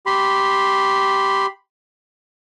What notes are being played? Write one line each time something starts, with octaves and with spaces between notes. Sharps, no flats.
G4 B5 C6